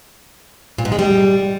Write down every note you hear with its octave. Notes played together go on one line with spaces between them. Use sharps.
A#2
G#2
G#3
G3